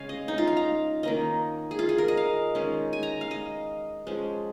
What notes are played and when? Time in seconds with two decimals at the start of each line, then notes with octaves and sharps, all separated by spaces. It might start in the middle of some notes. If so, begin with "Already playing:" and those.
Already playing: C#3 G#3 C#4 C#5 F5 G#5
0.09 D#5
0.28 D#4
0.38 F4
0.47 F5
0.57 A#5
1.03 D#3 A#3 C#4 D#5
1.71 G#4
1.79 F4
1.89 G#4
1.98 A#4
2.08 D#5
2.17 F5
2.55 D#3 G#3 C#4
2.93 G#5
3.03 A#5
3.21 F5
3.31 D#5
4.07 F3 G#3 C#4